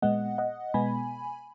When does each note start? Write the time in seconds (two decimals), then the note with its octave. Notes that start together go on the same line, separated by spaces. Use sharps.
0.02 A#2 G#3 B3 D#5 F#5
0.38 D#5 F#5
0.74 B2 G#3 B3 G#5 B5